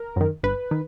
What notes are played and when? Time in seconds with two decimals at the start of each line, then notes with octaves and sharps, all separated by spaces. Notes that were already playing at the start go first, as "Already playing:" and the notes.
Already playing: A#4
0.16 F#2 D#3
0.43 G1 B4
0.71 D#3